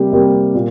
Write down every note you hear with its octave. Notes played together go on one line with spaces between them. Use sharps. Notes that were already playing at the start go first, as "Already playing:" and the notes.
Already playing: C3 G3 A#3 G4
C3 G3 A#3 G4
A#2